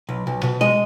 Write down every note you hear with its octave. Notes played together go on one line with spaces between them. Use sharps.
B1
B1
B2
G#3 D#5